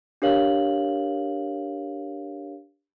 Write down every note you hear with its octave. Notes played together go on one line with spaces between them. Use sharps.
D4 G4 A#4 C#5 F5 F#7